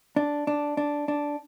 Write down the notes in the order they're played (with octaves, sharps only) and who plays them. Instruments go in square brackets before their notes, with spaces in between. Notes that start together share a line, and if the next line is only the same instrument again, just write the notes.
[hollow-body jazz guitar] D4
D4
D4
D4